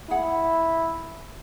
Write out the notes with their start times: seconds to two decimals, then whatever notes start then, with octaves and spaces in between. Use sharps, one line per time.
0.10 E4 G#4 F#5